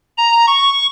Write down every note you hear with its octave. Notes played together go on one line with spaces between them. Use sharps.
A#5
C#6